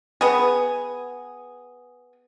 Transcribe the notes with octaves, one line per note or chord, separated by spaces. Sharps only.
B3 G#4